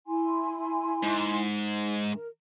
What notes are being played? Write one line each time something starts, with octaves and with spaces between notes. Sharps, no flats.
E4 G#5 C6
G#2
A#4